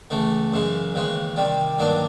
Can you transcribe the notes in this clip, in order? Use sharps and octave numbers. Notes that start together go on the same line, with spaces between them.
C#2 C#3 E3 A3
F#2 C#3 E3 G#3
D#2 C#3 E3 G#3
C3 D#3 G3
G2 D#3 F#3 A#3 D4